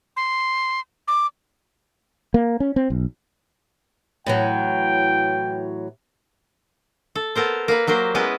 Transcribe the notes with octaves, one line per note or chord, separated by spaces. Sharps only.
C6
D6
A#3
C#4
C4
B1
A2 E3 F#3 G5
A4
B3 A4 A#4 C5
A#3 B4
F#3 A#3 G4 C5
G#3 B3 C#4 E4 B4